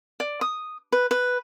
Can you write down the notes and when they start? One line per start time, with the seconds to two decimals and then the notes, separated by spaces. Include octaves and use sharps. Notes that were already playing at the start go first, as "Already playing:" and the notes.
0.20 D5
0.41 D#6
0.92 B4
1.11 B4